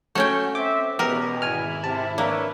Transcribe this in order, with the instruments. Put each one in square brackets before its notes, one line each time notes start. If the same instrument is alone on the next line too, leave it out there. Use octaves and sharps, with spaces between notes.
[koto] A3 C#4 G5 [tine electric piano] F#4
[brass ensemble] C4 E5 [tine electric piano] D6
[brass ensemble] E2 B2 [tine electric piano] B3 G4 [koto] A#4
[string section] G#1 E4 [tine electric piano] G#5 F6
[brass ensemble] C3 [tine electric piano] A5
[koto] A#3 [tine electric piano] D4 A#4 [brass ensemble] B4 C#5 E5